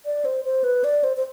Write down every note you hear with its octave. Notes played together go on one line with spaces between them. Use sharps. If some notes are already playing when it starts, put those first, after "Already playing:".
D5
C5
C5
B4
D5
C5
C5